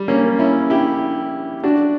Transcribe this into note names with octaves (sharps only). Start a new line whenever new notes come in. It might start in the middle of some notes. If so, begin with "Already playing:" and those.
Already playing: G3
A#3 C#4
C#4 E4
E4 G4
D4 F#4